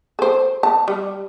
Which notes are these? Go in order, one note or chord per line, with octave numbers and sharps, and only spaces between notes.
A4 C5
A5
G3